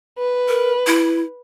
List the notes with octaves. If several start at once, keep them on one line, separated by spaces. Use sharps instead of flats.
B4
A#4
E4